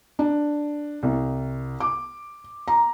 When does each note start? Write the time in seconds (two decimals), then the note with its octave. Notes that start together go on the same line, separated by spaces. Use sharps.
0.19 D4
1.03 C2
1.80 D6
2.68 A#5